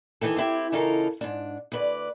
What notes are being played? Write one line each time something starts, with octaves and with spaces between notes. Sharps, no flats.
D#3 E3 G4 A4
C4 E4 G4
C#3 E3 D#4 F4 A4 A#4
G#2 D4
D2 B4 D5